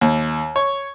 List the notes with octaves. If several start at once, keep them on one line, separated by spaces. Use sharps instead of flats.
D#2
C#5